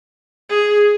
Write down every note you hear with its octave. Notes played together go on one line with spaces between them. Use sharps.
G#4